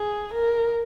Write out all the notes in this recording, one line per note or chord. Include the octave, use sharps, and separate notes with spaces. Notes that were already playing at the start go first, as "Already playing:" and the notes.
Already playing: G#4
A#4